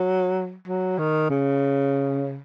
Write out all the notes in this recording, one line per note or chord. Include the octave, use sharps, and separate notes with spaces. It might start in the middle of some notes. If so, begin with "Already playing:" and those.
Already playing: F#3
F#3
D#3
C#3